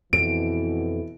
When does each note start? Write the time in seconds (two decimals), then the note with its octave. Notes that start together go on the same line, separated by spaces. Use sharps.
0.13 F2 B2 E3 E4 D7